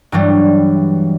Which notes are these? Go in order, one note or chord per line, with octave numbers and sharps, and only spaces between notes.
G2 E3 F#3 G3